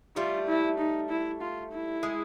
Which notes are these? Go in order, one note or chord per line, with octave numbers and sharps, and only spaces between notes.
G3 A3 F4
E4
D#4
E4
F4
E4
G#3